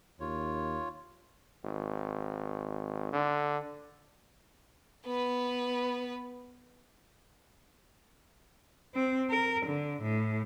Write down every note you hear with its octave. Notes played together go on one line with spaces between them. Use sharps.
D#2 F4 C#5
G#1
D3
B3 B4
C4
A#4
D3
A2